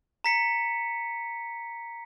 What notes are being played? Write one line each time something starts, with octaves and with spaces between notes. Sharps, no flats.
A#5 B6 C#7